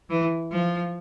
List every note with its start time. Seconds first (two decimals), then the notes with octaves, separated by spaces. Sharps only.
0.10 E3
0.52 F3